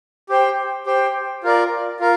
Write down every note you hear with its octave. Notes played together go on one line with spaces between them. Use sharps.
G4 C5 G5
G4 C5 G5
F4 A#4 D5
F4 A#4